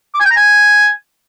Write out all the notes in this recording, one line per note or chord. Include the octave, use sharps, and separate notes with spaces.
D6
G#5
G5
A#5
G#5